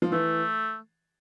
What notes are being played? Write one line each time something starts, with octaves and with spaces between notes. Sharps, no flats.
F3
E3 A3